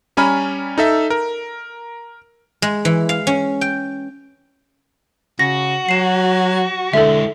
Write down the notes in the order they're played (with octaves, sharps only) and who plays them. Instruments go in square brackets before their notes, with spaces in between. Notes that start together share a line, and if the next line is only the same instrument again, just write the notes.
[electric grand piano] G3 C#4 G#5 A#5 B5 F6
D#4 A4 E5
A#4
[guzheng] G#3
E3
F5
C#4
G5
[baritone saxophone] C#3 [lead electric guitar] F#4 [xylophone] A#6
[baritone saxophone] F#3 [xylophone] C7 E7
[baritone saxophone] D3 [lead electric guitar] G#3 E4 [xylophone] A4 E5